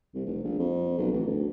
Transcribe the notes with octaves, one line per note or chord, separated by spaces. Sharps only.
C2
F1
A#1
F2
B1
A1
D2